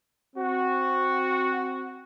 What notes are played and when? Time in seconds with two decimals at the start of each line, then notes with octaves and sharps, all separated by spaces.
0.36 C4 F#4